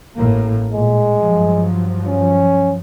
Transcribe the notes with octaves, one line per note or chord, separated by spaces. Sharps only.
A1 A2 A#3
A#2 G#3
G2 F3 F#3
C#4